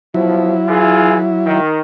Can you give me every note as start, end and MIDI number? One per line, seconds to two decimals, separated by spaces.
0.14 0.54 47
0.14 0.54 53
0.14 1.61 54
0.14 1.61 64
0.67 1.17 52
0.67 1.17 65
0.67 1.17 68
1.46 1.81 51